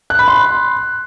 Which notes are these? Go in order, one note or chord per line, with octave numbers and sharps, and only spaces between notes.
F#6
B5
C6